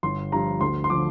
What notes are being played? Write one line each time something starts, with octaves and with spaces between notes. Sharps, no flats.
G1 C6
G2 F3 A#5
D2 C6
C6
D3 F3 D6